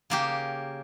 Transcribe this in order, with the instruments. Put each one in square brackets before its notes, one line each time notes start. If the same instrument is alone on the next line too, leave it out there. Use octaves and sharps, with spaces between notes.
[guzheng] C#3 A#3 G4